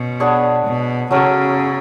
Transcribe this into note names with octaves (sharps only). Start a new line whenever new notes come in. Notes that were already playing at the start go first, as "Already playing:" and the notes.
Already playing: B2 C#4
B3 D4 G#4 C#5
B2
C#3 F#3 A3 C#4